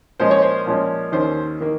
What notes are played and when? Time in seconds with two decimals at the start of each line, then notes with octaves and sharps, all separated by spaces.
0.20 A#2 F3 G#3 C#4 C5
0.31 C#5
0.42 C5
0.66 A#2 F3 G#3 C#4
1.12 D#2 D#3 A#3 C#4 C5
1.61 D#3 A#3